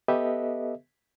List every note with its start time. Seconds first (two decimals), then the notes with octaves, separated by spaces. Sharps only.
0.08 B3 G4 A4 B4 D#5 E5